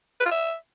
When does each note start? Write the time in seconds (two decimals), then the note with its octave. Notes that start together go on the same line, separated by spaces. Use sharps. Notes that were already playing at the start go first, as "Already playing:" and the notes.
0.20 B4
0.26 F4
0.31 E5